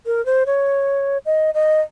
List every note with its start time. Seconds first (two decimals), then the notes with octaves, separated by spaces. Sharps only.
0.06 A#4
0.26 C5
0.46 C#5
1.26 D#5
1.54 D#5